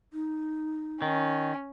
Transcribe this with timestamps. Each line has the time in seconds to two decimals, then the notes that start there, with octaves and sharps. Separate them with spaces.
0.13 D#4
1.02 D#3 C#4